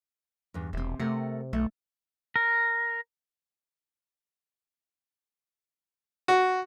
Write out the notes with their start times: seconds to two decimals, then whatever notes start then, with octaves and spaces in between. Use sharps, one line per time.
0.54 E2 G2
0.73 E1 C3 C4
0.99 C3 A3 A#4 F#5
1.53 B1 A3
2.36 A#4
6.28 F#4